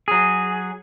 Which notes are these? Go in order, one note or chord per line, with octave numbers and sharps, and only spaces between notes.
F#3 G#4